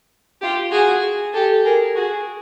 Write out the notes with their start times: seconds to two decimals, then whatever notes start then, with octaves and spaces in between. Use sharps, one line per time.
0.41 F4 G4
0.72 F#4 G#4
1.33 G4 A4
1.64 G#4 A#4
1.95 F#4 G#4